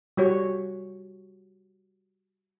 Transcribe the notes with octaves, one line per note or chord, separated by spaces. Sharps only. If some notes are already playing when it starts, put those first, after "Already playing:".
G3 F#4 C#5